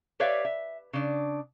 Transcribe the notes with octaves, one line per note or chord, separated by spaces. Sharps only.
G4 B4 C#5 D5 E5 F5
E5
C#3 D4